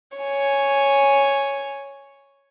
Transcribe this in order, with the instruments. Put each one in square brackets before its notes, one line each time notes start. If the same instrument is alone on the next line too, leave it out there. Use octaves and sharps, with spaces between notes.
[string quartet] C#5 G#5